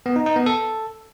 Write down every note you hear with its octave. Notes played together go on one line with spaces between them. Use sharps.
B3
D#4
D#4
B3
A4